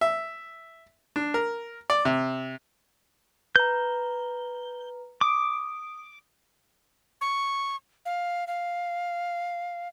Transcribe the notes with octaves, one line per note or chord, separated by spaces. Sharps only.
E5
D4
A#4
D5
C3
B4 A#5 G6
D6 D#6 D7
C#6
F5
F5